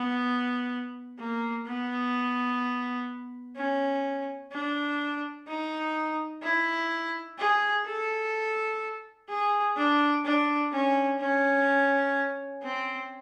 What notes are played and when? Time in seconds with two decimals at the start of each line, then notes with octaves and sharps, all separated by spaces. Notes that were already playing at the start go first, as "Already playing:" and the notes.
Already playing: B3
1.19 A#3
1.67 B3
3.57 C#4
4.52 D4
5.48 D#4
6.43 E4
7.38 G#4
7.87 A4
9.29 G#4
9.77 D4
10.25 D4
10.72 C#4
11.20 C#4
12.63 C4